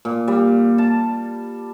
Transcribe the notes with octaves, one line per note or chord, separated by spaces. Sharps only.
A#2
G3
A5